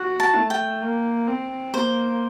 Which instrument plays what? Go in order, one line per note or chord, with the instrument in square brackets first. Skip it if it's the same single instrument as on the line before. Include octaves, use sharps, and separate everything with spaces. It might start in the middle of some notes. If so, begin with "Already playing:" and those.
Already playing: [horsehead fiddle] F#4
[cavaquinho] A5
[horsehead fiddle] A3
[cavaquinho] G5
[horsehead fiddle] A#3
C4
[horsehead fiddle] A#3 [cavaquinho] C5